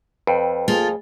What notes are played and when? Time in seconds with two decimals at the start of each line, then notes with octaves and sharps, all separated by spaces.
0.27 F2 B4 G5
0.68 A#3 F4 G#4 A4